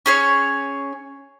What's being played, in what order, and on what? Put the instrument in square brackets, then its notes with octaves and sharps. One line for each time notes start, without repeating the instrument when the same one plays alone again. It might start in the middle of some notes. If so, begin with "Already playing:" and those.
[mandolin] C#4 G#4 C#5